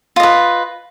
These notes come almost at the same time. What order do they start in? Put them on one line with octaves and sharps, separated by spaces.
F4 D#5 B4